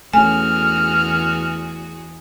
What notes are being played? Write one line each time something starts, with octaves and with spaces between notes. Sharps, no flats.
E2 A3 C#4 F#4 G#4 G#5 F6